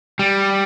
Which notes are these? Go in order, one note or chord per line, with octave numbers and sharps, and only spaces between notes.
G3